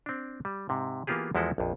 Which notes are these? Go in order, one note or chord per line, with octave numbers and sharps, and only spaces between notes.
C4 D4
G3
G#2 C3
E3 A#3 B3 F4 G4 G#4
E2 F3 G#3 E4 F#4 A4
A#1 F2